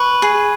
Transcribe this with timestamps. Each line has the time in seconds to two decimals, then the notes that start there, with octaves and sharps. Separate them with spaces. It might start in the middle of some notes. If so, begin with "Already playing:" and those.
Already playing: B4 C#6
0.22 G#4